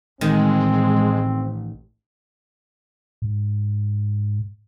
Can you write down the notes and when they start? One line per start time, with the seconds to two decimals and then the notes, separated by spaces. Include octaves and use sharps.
0.21 A1 D#3 G#3 C4
3.22 G#2